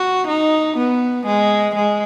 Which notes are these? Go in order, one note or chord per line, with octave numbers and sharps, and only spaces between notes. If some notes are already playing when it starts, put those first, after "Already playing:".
Already playing: F#4
D#4
B3
G#3
G#3